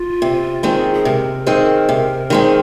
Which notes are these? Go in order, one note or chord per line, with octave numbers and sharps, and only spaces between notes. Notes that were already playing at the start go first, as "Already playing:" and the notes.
Already playing: F4
C3
D#3 G#3 C4
G#4
C3 A#4
D#3 G#3 C4
C3
D#3 G#3 C4